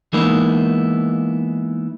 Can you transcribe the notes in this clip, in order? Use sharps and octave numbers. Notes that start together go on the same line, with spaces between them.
E3 G#3 A#3 B3 D#4 E4